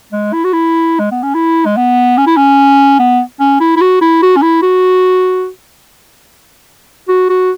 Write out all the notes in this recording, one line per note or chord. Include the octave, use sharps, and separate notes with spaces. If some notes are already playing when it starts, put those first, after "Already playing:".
G#3
E4
F#4
E4
G#3
B3
C#4
E4
G#3
B3
C#4
E4
C#4
B3
C#4
E4
E4
F#4
E4
F#4
C#4
E4
F#4
F#4
F#4